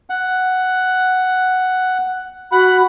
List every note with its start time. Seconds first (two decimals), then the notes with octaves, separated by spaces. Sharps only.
0.10 F#5
2.52 F#4 F#5 B5